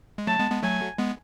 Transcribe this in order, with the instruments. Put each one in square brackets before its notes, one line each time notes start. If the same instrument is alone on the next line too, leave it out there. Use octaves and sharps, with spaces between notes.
[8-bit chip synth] G#3
[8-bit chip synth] F#3 A3 [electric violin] A5
[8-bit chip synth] G#3 B3
G#3 B3
[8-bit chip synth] F#3 A3 [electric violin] G#5
[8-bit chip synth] G#3 B3